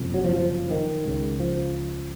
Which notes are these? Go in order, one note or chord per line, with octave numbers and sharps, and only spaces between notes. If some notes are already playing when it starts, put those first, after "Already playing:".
Already playing: F#1 F2 C3
F#3
F3
F3
D#3
C#2 C#3
F3